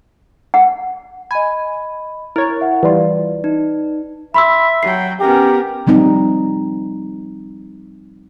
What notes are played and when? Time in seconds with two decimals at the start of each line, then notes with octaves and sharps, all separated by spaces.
0.54 F#5
1.31 D#5 G#5 B5
2.36 E4 A#4 C#5
2.61 E5 F#5
2.83 E3 G3 F4 B4 D5
3.44 D#4
4.34 E5 B5 C6 E6
4.83 F#3 G5 C7
5.20 B3 C#4 G4 A#4
5.87 F3 G3 C4 D#4